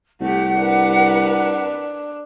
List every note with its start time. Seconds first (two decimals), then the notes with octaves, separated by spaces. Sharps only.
0.21 C2 A3 G4 F#5
0.58 D4 A#4 B4